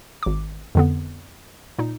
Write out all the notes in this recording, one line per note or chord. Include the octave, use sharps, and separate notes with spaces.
G#1 D6
F2 D3 B3
A#2 D#4